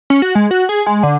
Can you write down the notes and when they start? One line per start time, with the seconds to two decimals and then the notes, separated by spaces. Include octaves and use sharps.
0.10 C#4
0.22 F#4
0.35 G#3
0.51 F#4
0.69 G#4
0.86 G#3
1.03 D3